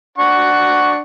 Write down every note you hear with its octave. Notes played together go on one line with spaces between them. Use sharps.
D4 F#5 C#6